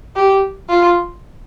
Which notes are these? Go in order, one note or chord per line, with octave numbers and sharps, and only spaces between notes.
G4
F4